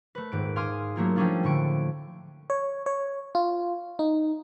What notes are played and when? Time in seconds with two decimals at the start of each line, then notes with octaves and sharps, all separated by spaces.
0.15 A3 B4
0.32 D#1 G#2 D7
0.56 F5 G#5 C6 D6 D#6 F6
0.96 F#3 A3 A#3 F4
1.16 F3 G3 A3 C#4 D4 F4
1.43 A2 D3 C#6 D7
2.50 C#5
2.86 C#5
3.35 F4
3.99 D#4